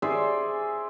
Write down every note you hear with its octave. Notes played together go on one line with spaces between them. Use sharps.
G#4 C5 D5 E5